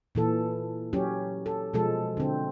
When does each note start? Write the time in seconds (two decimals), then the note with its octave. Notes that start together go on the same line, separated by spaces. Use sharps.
0.15 A#2 E3 A4
0.93 F#3 C#4 G4
1.46 A4
1.74 B2 F3 G#3 A4
2.17 D3 C4